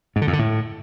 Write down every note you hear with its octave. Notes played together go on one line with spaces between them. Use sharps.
G#2
D3
F2
D3
A2